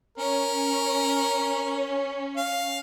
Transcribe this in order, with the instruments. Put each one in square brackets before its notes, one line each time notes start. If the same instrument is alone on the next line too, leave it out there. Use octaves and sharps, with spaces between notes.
[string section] C#4 [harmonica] A#4
[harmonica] F5